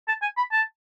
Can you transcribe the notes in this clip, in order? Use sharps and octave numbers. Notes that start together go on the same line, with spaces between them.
A5
G#5
B5
A5